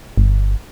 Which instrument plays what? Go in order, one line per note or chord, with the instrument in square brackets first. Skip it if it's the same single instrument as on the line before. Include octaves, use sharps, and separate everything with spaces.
[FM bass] G1